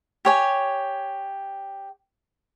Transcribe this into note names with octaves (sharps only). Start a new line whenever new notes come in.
G4 C#5 G#5